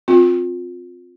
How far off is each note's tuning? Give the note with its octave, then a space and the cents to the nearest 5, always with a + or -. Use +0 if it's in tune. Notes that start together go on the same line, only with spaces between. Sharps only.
C4 +0 F4 +25